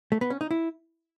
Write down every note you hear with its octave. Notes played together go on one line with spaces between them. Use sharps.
A3
B3
C#4
D#4
E4